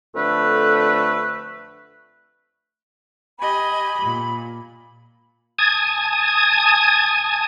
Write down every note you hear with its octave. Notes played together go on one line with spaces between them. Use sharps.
F2 D3 A3 B4
G4 D#5 G#5 B5
A#2
G#5 A5 D#6 G#6